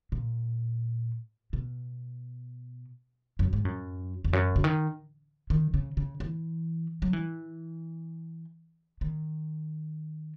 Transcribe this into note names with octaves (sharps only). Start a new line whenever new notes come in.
A#2
B2
F#2
G#2
F#2
E2
F#2
C#3
D#3
D#3
C#3
C#3
E3
F#3
E3
D#3